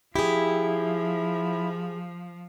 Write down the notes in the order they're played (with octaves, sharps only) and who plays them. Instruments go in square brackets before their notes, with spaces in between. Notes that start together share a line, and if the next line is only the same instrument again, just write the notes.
[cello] F3 [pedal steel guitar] E4 [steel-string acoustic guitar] G4 G#4